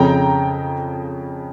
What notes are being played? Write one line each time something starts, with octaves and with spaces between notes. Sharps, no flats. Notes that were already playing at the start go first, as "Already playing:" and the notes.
Already playing: F2 C#3 G5 A#5